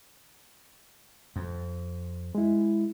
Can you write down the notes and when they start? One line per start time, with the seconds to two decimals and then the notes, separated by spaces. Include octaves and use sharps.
1.36 F2
2.35 G#3 E4